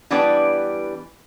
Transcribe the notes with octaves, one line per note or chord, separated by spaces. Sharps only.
E3 G3 B3 D4 B4 D5